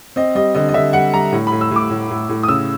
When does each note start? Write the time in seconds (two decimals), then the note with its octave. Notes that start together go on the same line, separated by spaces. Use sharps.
0.16 C4 D#5
0.35 G3 D#5
0.54 D3 D#5
0.69 D#5
0.74 D3 E5
0.93 G3 F#5
1.13 G3 A#5
1.32 A2
1.47 A2 B5
1.61 E6
1.71 A2 D6
1.90 A2
2.10 A2
2.29 A2
2.43 D#6
2.48 C#3 E6